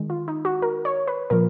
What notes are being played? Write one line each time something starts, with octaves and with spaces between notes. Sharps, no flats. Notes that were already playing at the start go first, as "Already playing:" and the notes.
Already playing: D#3 G#3
F4
D#4
F#4
A#4
C#5
B4
A#2 F3 A#4